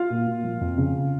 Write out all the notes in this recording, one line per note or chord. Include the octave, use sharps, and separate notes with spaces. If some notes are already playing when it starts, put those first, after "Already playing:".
Already playing: F4 F5
A#2
A#2
F3
F2
C#3